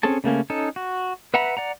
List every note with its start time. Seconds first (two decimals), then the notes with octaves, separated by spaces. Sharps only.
0.03 C4 C#4 G#4 A4 A5
0.24 C#3 A3 A#3 C#4
0.50 C#4 D#4 A4
0.76 F#4
1.34 B4 E5 F#5 A#5 B5
1.57 D5 F#5 A#5